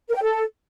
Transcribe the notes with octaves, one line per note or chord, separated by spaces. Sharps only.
A#4
G5
A4